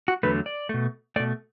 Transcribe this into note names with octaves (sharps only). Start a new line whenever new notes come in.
F#4
E2 D3 F#3 A3 B4
D5
B2 A3
B2 A3 D5